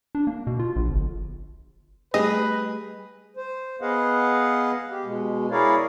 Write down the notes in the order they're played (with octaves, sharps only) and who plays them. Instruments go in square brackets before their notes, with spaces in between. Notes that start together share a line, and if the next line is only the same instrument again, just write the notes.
[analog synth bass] D4
A#3
B2
F4
A#1
G1
[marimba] G3 A3 [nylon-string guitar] G4 G#4 [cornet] B4 [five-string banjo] D#5
[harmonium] C5
B3 G#4 B4 D#5 F5 F#5
G4
B2 G#3
E4 G#4 A#4 C#5 D5 F5